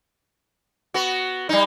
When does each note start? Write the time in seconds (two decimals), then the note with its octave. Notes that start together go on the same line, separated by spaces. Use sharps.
0.94 B3 F#4
1.49 G3 D#4